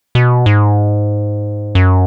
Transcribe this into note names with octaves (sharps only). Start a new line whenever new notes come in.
B2
G#2
F#2